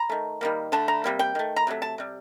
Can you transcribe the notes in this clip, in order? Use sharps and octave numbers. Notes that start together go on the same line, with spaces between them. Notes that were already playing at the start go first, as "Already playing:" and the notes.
Already playing: A#5
D#3 A3
D#3 G3 A#3
D3 A3 A5
A#5
C3 G3 A#3
G5
D#3 A3
A#5
C3 F#3 A3
A5
C3 G3